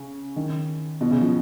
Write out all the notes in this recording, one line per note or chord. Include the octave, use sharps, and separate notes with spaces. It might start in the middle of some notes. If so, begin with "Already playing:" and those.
Already playing: C#3
D#3
B2
C#3
F3